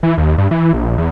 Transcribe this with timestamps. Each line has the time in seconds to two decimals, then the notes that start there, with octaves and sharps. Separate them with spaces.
0.03 E3
0.18 D#2
0.38 G2
0.51 E3
0.73 A#1
0.98 E2